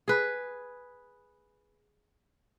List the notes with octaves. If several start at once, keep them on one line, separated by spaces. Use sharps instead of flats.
G#4 B4